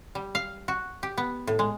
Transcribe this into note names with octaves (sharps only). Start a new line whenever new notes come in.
G3
F5
F#4
G4
B3
A2
G#3